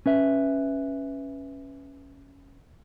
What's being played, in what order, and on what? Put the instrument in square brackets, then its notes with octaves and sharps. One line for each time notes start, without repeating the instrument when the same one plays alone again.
[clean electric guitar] C#4 B4 E5